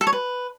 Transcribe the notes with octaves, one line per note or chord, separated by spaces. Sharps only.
A4
C#5
B4